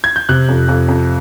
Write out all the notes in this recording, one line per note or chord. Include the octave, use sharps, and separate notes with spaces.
G#6
G6
C3 F#6
F2
F2
F2